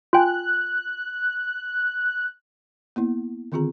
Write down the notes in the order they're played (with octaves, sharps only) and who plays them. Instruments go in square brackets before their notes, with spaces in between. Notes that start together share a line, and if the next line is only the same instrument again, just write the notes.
[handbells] F4 G5 G#5 [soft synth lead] F#6
[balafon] A#3 B3 E4
D3 D#3 C4 F4 G#4 A#5